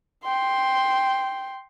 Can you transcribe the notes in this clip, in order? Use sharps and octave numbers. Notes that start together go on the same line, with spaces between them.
G5 C6